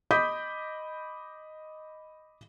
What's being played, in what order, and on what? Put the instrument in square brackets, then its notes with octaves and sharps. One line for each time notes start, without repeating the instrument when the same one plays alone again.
[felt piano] D#5 B5 D6 D#6 G6 B6